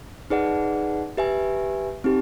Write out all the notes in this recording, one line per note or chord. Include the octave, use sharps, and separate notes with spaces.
D#4 G#4 B4 D5 F#5
G4 B4 E5 G#5
C4 D#4 G4